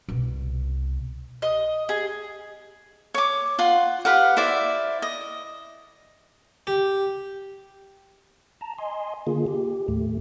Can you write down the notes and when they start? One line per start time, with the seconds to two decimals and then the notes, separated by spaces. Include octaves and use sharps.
0.09 C2 B2
1.42 D#5
1.89 G#4
3.14 C#5 D6
3.59 F4 F#5 C6
4.05 G4 B4 F5 F#5
4.37 E4 C5 D5 E5
5.02 D#5
6.67 G4
8.61 A5 A#5
8.78 D#5 G#5 C6
9.27 D3 A#3 F4 G#4
9.47 G4
9.88 D#2 A2 A3